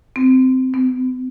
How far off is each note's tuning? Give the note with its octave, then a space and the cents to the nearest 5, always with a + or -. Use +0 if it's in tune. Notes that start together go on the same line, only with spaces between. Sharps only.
C4 -15
C4 -45